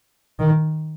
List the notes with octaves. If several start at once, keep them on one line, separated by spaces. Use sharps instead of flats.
D#3